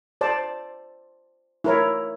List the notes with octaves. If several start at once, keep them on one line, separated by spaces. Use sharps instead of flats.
C5 D5 A5
E4 A#4 C#5